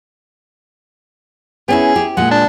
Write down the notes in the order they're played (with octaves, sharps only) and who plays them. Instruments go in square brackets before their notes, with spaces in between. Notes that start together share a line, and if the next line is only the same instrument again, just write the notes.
[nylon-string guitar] B3 C#4 E4 [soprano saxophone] G#4
[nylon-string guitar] G4
[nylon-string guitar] A#2 G#3 [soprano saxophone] F#5
[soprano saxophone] D4